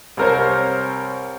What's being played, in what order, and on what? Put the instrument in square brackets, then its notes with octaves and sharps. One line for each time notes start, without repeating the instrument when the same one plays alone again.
[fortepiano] C2 C4 A#4 C5 C#5